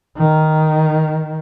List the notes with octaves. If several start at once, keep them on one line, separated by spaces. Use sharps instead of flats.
D#3